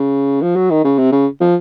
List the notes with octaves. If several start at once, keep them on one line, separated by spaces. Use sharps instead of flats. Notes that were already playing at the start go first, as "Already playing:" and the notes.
Already playing: C#3
F3
F#3
D#3
C#3
C3
C#3
F3